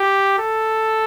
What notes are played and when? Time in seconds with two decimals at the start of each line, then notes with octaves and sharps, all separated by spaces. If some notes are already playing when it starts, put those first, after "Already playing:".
Already playing: G4
0.39 A4